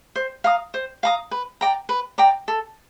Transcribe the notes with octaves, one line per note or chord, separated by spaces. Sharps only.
C5
F5 A#5 D#6
C5
F5 A#5 D#6
B4
D5 G5 A#5
B4
D5 G5 A#5
A4